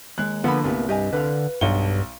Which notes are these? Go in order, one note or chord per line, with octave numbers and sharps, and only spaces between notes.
D#2 G#3 F#6
D3 F3 A#3 B3 B5
C2 A#2 A3 B3
G2 G4 D#5 G#5
D3 B4 F5
B1 G2 F#5 G7